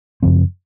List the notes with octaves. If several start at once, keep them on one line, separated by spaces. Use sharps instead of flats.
F#2 C#3 F3 C4